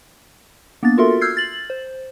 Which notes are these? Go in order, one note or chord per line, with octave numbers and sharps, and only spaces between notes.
A#3 B3 D4 A6
F4 F#4 A4 A#4 E5 C6
E6 F6 G6 G#6 C7
A6 F#7
C5